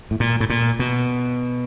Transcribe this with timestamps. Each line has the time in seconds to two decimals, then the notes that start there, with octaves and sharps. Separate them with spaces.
0.11 A2
0.20 A#2
0.40 A2
0.50 A#2
0.79 B2